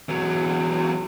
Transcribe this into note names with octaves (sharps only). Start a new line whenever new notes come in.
E2 F#3